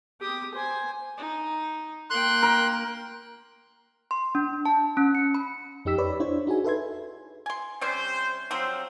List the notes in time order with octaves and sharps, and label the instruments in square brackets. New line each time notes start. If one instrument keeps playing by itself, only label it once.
[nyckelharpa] G4 D#6
C5 G#5
D#4
[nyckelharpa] A#3 G5 [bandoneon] C6 F#6
[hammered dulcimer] A#4
[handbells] C6
D4
A5
C#4
C#7
B5
[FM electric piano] F2 D#4 G4 E6 B6
B4 C#5 D5 B5
D4 E4 C5 C#5
D#4 F#4 G#4 G#5
A4 B4 E5 C6 G#6
[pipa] G#5 C6
[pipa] C3 G3 C#4 [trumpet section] C5
[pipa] F3 F#3 C4 [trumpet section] C5 F5